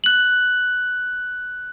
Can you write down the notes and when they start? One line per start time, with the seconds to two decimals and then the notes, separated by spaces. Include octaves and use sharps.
0.04 F#6 F#7